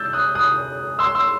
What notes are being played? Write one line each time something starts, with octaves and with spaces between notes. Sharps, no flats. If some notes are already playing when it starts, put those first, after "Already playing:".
Already playing: E6 G6 A6
D#6 F#6
D#6 F#6
C6 E6
C6 E6